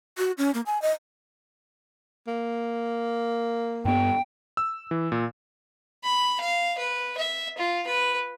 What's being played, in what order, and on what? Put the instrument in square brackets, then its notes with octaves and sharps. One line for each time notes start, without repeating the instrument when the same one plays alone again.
[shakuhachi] F#4
C#4
A#3
G#5
D#5
[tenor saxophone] A#3
[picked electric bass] G2 B3 [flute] G5
[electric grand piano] E6
E3
A#2
[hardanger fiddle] B5
F5
B4
E5
F4
B4